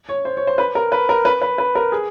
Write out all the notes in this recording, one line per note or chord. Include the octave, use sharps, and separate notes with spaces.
C#5
C5
C#5
C5
B4
A#4
B4
A#4
B4
B4
B4
A#4
G#4